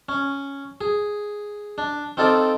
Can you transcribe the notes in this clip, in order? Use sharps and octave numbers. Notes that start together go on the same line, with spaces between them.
C#4
G#4
D4
C4 D#4 F4 A4 D5